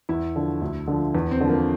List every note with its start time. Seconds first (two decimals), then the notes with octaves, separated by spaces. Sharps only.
0.09 E2 E4
0.35 D3 F3
0.61 D2
0.87 D3 F3
1.15 E2
1.31 C4
1.41 D3 F3
1.49 A#3